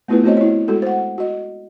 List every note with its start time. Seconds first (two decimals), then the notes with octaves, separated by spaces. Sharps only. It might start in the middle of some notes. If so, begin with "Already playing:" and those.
0.08 A3 B3 E4 F4 G#4 B4
0.24 A3 C4 F#4 C5 C#5 D#5
0.37 E4 C#5
0.68 G#3 F#4 A4
0.82 C5 F#5
1.18 F#4 D#5